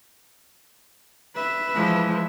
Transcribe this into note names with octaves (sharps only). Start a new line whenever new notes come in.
B4 E5
E3 F3 G#3